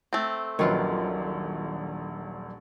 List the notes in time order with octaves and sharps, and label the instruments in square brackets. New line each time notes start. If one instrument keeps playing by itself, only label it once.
[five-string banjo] A3 C4
[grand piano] D#1 A#1 F#3 [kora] D#3 F4 B4